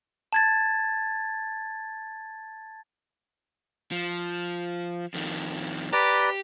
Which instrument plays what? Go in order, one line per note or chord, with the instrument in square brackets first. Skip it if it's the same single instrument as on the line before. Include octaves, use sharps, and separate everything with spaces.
[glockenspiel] A5 G#6 A6
[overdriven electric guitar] F3
F2 D#3
[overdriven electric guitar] G4 [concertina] B4 D5 A#5